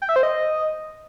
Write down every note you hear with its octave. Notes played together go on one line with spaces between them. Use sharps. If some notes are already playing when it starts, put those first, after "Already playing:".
G5
E5
C5
D#5